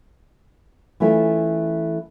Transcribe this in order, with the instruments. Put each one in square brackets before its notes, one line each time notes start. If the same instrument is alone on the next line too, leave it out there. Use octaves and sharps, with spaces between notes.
[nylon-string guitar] E3 A3 C#4 E4 F4